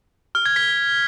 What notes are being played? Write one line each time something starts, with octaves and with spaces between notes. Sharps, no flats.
F6
G#6
B6